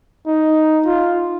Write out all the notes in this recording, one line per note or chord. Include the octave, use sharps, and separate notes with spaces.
D#4
F4